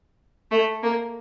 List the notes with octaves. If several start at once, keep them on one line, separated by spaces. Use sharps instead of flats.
A3
A#3